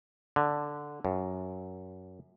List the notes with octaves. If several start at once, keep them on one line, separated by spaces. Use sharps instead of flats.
D3
F#2